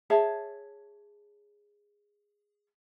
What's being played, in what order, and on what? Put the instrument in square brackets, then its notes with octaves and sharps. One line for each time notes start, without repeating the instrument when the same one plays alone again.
[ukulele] G#4 C#5 E5 A5